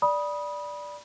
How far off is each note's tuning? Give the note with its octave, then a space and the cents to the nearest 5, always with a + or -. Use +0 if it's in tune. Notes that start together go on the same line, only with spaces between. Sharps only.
D5 +0 B5 -20 D#6 +0